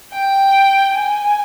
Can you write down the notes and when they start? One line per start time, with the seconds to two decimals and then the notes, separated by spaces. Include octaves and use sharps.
0.13 G5
0.94 G#5